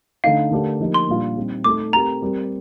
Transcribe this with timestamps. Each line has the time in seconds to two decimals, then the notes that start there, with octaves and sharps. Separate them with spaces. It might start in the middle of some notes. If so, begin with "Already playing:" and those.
0.24 D3 A3 D#4 F5
0.51 D3 A3 D4 G4 A#4
0.80 F3 A#3 D#4 G4
0.94 C6
1.08 A#2 G3 D4 F4
1.36 G3 C4 D#4
1.64 A3 D#4 A4 D6
1.93 A3 C4 G4 A#4 A#5
2.22 G3 C4 G4 A#4